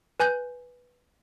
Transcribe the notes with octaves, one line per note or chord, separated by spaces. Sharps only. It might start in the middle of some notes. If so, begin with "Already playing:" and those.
B4 G#5 F#6 G6